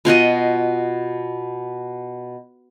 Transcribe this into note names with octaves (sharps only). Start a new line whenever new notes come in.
B2 F4 F#4 D#5